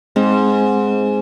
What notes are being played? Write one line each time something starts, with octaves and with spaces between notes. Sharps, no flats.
G#2 G#3 C4